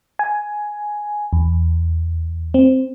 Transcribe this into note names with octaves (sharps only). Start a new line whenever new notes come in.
G#5
E2
C4